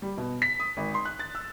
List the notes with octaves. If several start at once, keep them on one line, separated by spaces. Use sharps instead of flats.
G3
B2
B6
D#6
G#1
C6
F#6
A6
E6